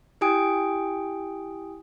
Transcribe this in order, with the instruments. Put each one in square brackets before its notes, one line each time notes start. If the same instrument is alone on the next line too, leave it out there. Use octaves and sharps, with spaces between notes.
[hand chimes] E4 G4 G5 G#5 D#6 D7